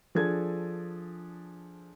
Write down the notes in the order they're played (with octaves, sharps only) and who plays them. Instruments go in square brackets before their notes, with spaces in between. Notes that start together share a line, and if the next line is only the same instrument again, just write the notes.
[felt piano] F3 D4 G#4 A4 G#6